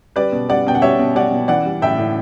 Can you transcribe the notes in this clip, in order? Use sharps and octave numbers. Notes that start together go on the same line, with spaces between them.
G3 B4 D5
B2
G3 D5 F#5
B2 G5
F#5
G3 C#5 E5
B2
G3 D5 F#5
B2
E3 D5 F#5
G3
A2 E5 G5
A2